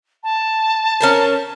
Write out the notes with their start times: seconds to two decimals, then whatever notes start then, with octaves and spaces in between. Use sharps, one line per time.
0.23 A5
1.00 C#4 A#4 C5